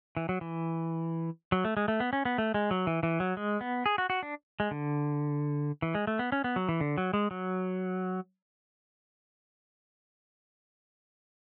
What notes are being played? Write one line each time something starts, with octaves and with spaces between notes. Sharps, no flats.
E3
F#3
E3
F#3
A3
G#3
A3
B3
C#4
B3
A3
G#3
F#3
E3
E3
F#3
G#3
B3
G#4
F#4
F#4
D4
G#3
D3
E3
G#3
A3
B3
C#4
B3
F#3
E3
D3
F#3
G#3
F#3